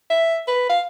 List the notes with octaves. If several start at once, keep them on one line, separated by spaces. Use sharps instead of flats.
E5
B4
F5